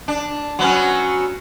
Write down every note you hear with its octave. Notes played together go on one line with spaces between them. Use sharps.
D4
F#3 B3 C#4